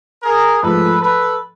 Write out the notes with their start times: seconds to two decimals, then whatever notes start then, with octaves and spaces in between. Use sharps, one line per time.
0.23 G#4 A#4
0.62 G#2 F3 A3 A4 B4
1.02 A4 B4